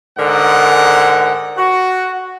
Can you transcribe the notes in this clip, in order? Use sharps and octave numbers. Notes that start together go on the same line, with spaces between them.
G#2 D3 A#4 F#5
F#4